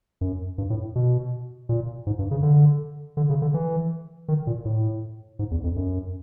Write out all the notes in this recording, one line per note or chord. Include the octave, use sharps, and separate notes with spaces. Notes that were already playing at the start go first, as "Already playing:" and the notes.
F#2
G2
A2
B2
A#2
G#2
G2
C#3
D3
D3
C#3
D3
E3
D#3
A#2
A2
G#2
E2
F2
F#2